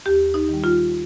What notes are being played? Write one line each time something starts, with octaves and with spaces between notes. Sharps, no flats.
D#2 G4
D#4
D#3 G3
F4